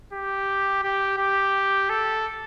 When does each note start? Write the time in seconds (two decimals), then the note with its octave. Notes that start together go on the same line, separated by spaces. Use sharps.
0.13 G4
0.84 G4
1.18 G4
1.89 A4